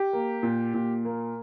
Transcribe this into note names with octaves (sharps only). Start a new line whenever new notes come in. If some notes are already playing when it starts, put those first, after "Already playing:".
Already playing: G4
A#3
A#2
A#2
A#3